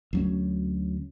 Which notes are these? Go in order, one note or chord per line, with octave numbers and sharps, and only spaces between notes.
D2 F#3 C#4